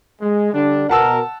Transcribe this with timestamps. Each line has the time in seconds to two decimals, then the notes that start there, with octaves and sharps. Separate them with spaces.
0.22 G#3
0.54 D3 G3 D4
0.89 B2 A#4 F#5 A5 E6